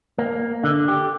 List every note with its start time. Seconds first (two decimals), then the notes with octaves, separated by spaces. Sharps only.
0.18 A#3
0.64 D3
0.88 G4